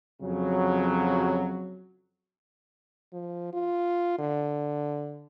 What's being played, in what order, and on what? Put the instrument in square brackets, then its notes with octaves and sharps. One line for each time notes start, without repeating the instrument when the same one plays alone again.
[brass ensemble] F2 C#3 F#3
[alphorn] F3
F4
D3